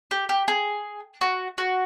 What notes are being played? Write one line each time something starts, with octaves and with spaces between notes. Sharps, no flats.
G4
G4
G#4
F#4
F#4